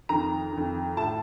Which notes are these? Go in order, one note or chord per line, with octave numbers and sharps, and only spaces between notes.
F2 D#3 A#5
F2 D#3
A2 A5